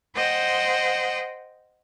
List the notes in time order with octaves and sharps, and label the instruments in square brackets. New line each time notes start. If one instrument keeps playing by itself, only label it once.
[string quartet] C5 D#5 F#5 G5